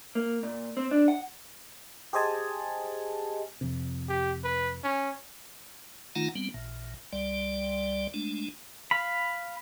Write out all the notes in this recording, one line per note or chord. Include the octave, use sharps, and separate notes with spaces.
A#3
A#2
C4
D4
F#5
G4 G#4 C5 D#5 G#5 A5
F2 C3
G4
B4
C#4
D#3 A3 D#4 F4 F#5 A#5
G3 B3 C4
A1 A#2
C2 G3 D5
G#3 A3 D4
F5 B5